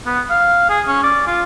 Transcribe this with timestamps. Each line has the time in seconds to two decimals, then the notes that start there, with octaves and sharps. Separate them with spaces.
0.06 B3
0.30 F5
0.69 G#4
0.88 C#4
1.03 D5
1.27 F4